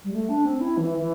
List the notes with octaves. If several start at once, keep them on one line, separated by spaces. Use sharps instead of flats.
G3
A3
D4
C4
E4
E3
E3